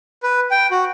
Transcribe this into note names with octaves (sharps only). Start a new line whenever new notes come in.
B4
G5
F#4